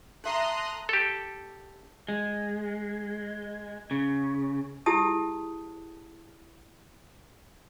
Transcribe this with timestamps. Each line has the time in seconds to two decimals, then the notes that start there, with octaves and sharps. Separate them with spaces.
0.24 A4 E5 A#5 C6 D#6 F#6
0.89 G4 A4
2.09 G#3
3.91 C#3
4.86 E4 G4 G#4 A5 D#6